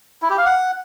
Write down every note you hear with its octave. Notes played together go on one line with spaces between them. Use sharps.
E4
G4
F5
F#5